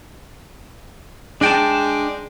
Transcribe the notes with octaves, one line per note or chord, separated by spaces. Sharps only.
G#3 D4 G5 A5